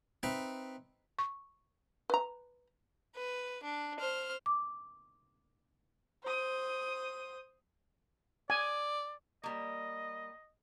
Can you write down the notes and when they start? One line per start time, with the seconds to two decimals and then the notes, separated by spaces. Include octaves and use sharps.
0.23 C4 D#4 B4 E5
1.19 C#6
2.10 B4 A#5
3.15 B4
3.63 D4
4.00 C5 F6
4.46 D6
6.24 C5 D#6
8.50 D5 G#5
9.43 G3 A#3 D#5